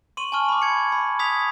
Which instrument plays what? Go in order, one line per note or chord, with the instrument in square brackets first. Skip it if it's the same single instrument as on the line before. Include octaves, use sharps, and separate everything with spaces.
[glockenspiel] C6 C#6 D#7 F#7
G#5 A5 C#6 F6
B5 D6
G#6 C#7
B5
D#6 G#6 B6 F7